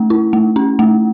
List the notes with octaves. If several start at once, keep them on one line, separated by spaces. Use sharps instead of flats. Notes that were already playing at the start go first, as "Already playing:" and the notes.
Already playing: A3 C#4
E4
A3
C#4
A3